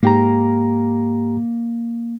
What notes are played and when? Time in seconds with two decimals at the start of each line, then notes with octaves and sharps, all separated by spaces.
0.03 G#2 A#3 G4 A#5